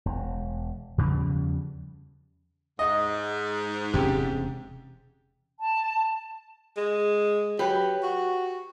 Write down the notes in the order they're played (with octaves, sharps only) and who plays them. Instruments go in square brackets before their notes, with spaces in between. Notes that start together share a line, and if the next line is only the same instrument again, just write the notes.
[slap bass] E1
E2 C#3 F3 G3
[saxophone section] G#2 [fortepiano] D#5
[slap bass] E1 C3 C#4 [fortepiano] G4
[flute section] A5
[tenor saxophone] G#3
[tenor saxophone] F#3 [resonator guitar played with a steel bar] G4 B4
[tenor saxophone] F#4